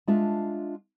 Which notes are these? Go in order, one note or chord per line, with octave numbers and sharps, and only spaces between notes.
G#3 D4 F4 E5 A5